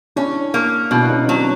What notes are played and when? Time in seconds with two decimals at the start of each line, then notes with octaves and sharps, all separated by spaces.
0.16 C#4 D4 E4
0.54 A#3
0.91 B2 D4 E4
1.02 E4
1.10 C#4 D#4
1.24 C#4
1.28 F#3 C4 D4